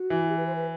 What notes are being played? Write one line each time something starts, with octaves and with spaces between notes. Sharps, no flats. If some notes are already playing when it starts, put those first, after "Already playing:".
Already playing: F#4
E3
G4
B4
C5
B4